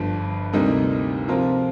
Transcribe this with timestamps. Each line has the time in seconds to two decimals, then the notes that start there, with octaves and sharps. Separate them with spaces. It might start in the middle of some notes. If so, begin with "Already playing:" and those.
Already playing: G1 G2 F3
0.53 D2 C3 G3 A#3 D#4
1.28 C3 F3 C4 F4 A#4